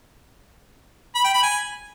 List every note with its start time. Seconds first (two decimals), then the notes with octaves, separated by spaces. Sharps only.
1.15 B5
1.24 G5
1.34 B5
1.43 G#5